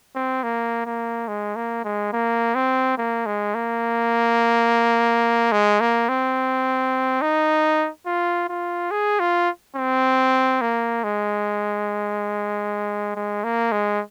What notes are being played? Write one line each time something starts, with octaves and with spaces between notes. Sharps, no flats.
C4
A#3
A#3
G#3
A#3
G#3
A#3
C4
A#3
G#3
A#3
G#3
A#3
C4
D#4
F4
F4
G#4
F4
C4
A#3
G#3
G#3
A#3
G#3